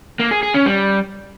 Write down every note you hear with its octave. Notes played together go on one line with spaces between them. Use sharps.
A#3
G#4
G#4
C#4
G3